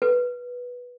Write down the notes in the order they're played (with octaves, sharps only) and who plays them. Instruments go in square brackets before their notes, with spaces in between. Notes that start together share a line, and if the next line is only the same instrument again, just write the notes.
[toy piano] B4